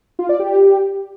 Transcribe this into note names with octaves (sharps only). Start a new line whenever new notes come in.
F4
D5
G4